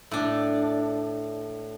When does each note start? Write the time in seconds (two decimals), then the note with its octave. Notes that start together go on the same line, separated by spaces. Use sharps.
0.11 A2 D4